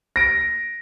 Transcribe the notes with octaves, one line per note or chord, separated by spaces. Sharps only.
A#6 D7